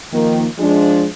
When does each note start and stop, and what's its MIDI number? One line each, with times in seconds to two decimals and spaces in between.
0.13 0.46 51
0.13 0.46 53
0.13 0.46 58
0.59 1.07 53
0.59 1.07 56
0.59 1.07 62